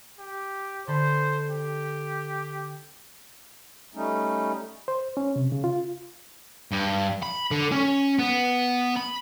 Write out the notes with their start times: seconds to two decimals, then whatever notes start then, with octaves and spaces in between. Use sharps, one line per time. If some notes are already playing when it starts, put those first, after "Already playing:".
0.19 G4
0.87 D3 A4 C5 B5
1.49 G4
3.95 G3 A3 C#4 D#4
4.88 C5
5.17 C#4
5.36 C3
5.52 C#3
5.64 F4
6.71 G2
7.23 B5
7.51 D3
7.72 C#4
8.19 B3
8.97 B5